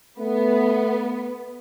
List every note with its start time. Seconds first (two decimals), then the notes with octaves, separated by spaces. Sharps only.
0.19 A3 B3